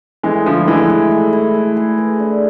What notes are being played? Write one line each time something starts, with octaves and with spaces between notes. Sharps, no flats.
E3 G#3 A3
D3 F3 E4
E3 G#3 A3
G#4
A3
E4
A3
G#4
B4
D4